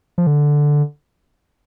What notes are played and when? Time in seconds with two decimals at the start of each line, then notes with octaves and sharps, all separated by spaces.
0.18 F3
0.27 D3